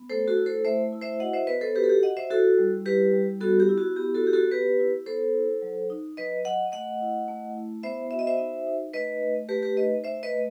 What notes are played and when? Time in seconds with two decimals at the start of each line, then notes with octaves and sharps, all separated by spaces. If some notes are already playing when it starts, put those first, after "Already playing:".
Already playing: B3
0.10 A3 A4 C5
0.28 F#4 A4
0.37 E4
0.46 A4 C5
0.64 A3 C5 E5
0.93 E4
1.02 C5 E5
1.20 F#4 D#5 F#5
1.34 C5 E5
1.47 B3 B4 D#5
1.61 A4 C5
1.76 F#4 G4 B4
1.84 A4
1.89 G4
2.03 F#4 D#5 F#5
2.17 C5 E5
2.30 E4 F#4 A4
2.58 G3
2.85 E4 G4 B4
3.13 G3
3.41 B3 F#4 A4
3.60 G4
3.69 E4
3.78 F#4
3.96 B3 G4
4.14 F#4 A4
4.25 B3 G4
4.33 F#4 A4
4.52 B3 G4 B4
4.80 E4
5.06 B3 A4 C5
5.34 E4
5.62 F#3
5.90 D#4
6.17 F#3 B4 D#5
6.45 F#3 D#5 F#5
6.72 A3 D#5 F#5
7.01 E4
7.28 A3
7.55 E4
7.83 B3 C5 E5
8.11 F#4 E5
8.19 D#5
8.27 C5 E5
8.39 D#4
8.67 D#4
8.94 A3 B4 D#5
9.22 A3
9.49 A3 G4 B4
9.62 G4 B4
9.77 D#4 B4 D#5
10.04 A3 C5 E5
10.23 B4 D#5
10.32 A3